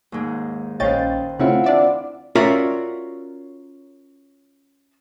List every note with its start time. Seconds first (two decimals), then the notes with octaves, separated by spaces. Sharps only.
0.12 D#2 G#2
0.80 A#1 C#4 B4 C5 D#5 F5 G5 A6
1.39 C#3 A3 C4 E4 F4 F#5
1.64 D4 D5 E5
2.35 C#4 F4 F#4 A#4 D5 E5